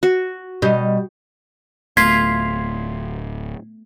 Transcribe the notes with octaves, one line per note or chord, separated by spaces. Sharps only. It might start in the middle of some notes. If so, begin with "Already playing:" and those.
F#4
B2 G3 D#5
D1 A3 B3 F4 G#6 B6 C7